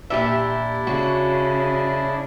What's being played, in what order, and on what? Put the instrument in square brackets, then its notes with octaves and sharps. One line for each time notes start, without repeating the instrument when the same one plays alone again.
[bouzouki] A#2 G4 E5 [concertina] D4 E4 D5
[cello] C#3 [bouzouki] F#4